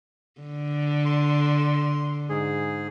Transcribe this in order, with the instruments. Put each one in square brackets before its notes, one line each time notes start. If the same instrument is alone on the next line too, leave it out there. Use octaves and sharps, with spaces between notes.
[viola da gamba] D3
[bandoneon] C6
G#2 G#4